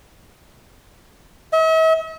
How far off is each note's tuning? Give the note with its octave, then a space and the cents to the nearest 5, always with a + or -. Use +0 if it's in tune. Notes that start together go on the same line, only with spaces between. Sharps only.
E5 -45